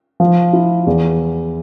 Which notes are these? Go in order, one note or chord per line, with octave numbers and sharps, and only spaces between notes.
F3
E4
E2